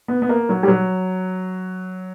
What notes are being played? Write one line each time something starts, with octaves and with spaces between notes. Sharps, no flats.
B3
B3
A#3
F#3
G3
F#3